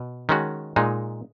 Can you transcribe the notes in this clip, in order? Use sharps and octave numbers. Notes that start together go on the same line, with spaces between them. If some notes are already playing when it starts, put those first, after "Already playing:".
Already playing: B2
D#3 G#3 C#4 F#4
A#2 G#3 D#4